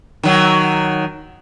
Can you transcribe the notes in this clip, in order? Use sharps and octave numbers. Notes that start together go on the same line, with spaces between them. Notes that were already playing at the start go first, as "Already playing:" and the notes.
D#3 F#3